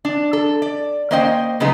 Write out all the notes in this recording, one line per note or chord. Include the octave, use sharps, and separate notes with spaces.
D4
A4
D5
A#3 C#4 C5 D#5 F#5 G5
C#3 F#3 G#3 B3 D#4 F4